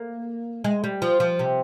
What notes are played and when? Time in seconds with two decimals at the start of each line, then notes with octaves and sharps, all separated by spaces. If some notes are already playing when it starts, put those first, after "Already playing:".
Already playing: A#3
0.64 G#3
0.84 G3
1.02 F3
1.20 F3
1.39 C3